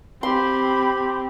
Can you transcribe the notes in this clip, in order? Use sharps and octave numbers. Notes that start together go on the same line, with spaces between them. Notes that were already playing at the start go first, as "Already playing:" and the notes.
C4 G4 B5 C6